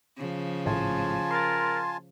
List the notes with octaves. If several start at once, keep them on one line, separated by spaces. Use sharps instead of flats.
C#3 F3
G#1 A2 F4 G#5 A5
A#4 C6 A6